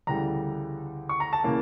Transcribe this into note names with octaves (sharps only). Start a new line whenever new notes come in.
D2 C#3 E3 G3 A#5
C#6
A#5
A5
C#3 E3 A#3 C#4